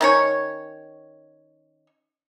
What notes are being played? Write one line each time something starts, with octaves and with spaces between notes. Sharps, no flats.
D#3 C#4 C#5